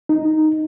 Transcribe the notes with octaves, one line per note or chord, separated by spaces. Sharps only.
D#4